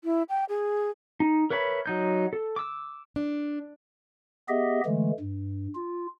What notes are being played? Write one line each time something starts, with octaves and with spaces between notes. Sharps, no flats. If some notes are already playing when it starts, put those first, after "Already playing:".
E4
G5
G#4
D#4
A#4 B4 C#5 E5 B5
F#3 D#4 G6
A4
D6 E6
D4
B3 G4 G#4 D#5 E5
D3 E3 G#3 A3
G2
F4